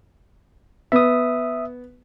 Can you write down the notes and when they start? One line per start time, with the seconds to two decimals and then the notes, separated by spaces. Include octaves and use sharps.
0.92 B3 E5 D#6